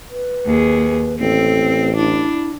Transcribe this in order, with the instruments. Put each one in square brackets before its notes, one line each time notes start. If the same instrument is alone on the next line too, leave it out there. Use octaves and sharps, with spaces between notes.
[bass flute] B4
[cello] D#2 G#4
[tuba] A1 [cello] C4 [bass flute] A4
[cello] D4 [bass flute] E4